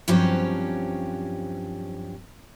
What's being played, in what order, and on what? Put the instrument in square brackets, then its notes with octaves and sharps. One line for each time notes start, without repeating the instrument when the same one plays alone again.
[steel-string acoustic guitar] G2 F3 F#3 C4 C#4 G4